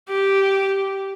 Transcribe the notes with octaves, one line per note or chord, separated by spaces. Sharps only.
G4